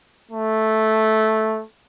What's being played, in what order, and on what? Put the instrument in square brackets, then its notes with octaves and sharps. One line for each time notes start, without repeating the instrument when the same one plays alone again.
[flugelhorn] A3